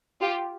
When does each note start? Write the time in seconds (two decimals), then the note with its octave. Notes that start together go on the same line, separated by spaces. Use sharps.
0.21 F4 G4